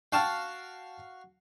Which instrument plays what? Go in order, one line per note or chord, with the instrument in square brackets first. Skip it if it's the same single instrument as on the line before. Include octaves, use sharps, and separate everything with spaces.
[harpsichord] F#4 F5 [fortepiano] G5 A5 F6